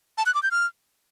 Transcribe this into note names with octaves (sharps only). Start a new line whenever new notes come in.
A5
F#6
D6
G6
F6